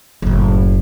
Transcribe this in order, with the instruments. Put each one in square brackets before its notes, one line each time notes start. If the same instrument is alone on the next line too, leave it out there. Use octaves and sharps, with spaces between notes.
[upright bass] F#1 A2